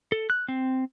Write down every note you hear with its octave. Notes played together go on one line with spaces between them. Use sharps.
A4
F#6
C4